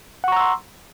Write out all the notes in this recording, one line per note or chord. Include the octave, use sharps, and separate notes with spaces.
F#5 A#5 C6 C#6 E6